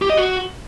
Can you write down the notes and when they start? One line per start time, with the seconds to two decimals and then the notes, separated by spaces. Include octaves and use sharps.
0.02 G4
0.09 D#5
0.17 F#4